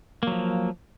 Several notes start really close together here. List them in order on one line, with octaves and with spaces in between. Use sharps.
A#3 F#3 F3